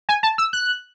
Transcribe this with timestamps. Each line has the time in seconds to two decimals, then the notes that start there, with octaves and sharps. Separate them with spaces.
0.09 G#5
0.23 A5
0.38 E6
0.53 F#6